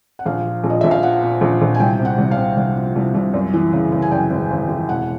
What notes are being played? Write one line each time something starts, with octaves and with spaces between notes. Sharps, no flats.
F#5
A#1 F5
F3
A#1
D#5
A#1 E5
F5
F3 F#5
A#2
A#1
A#1
G#5
C2 G5
C3
F#5
C2
F5
C3
C2 F#5
F3
C2
C2
F#2
E3
C#3
C#3
G#5
F#2 G5
G#1
G#1
E3
E1 F#5